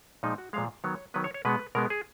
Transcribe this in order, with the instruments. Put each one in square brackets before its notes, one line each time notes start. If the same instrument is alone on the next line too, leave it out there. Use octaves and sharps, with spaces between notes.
[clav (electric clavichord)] A#2 F3 G#3 D#4
F#4
A#2 F3 G#3 F5
D#3 F#3 B3 C#5
D#3 F#3 B3 B4
C#5
C#5
B2 G#3 B3 B4
B2 G#3 B3 A#4
G#4